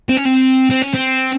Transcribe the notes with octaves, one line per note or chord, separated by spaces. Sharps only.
C4
C#4
C4
C4
C#4
C4